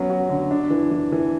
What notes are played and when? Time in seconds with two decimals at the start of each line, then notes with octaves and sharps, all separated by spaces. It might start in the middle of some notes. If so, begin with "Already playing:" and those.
Already playing: F#3 B3 C#4
0.10 F#4
0.29 D3
0.51 D4
0.70 E3
0.91 E3
1.12 E3